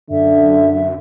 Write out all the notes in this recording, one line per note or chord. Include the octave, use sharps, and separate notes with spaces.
F#2 D3 E5